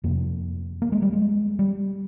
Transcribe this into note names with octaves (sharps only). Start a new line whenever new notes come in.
F2 C3 A#3
A#3
G#3
G3
G#3
G3